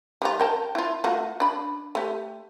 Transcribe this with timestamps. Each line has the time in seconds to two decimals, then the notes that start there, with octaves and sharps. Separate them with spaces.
0.22 G3 D#4 F4
0.40 A#4 G5 A5
0.75 E4 F4
1.04 A3 F4 F#4
1.40 D4 B5
1.95 A3 G4